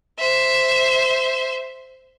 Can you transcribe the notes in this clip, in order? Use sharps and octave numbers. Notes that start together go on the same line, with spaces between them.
C5 E5